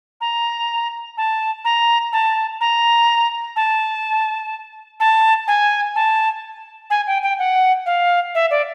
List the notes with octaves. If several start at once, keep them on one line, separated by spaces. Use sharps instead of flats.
A#5
A5
A#5
A5
A#5
A5
A5
G#5
A5
G#5
G5
G5
F#5
F5
E5
D5